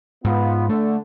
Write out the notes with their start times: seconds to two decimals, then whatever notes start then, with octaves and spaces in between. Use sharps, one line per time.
0.24 G#2 B3 F4
0.69 D3 A3